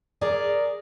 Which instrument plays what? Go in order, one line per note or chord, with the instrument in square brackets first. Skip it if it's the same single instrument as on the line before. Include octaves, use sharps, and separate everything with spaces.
[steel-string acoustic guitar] G#4 A#4 D5